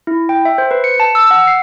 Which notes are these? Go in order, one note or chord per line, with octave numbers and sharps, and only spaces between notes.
E4
G5
E5
C5
B4
C#7
A5
E6
F#5
C7